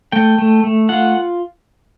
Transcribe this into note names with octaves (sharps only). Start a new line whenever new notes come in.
A3 G5
A3
A3
F4 F#5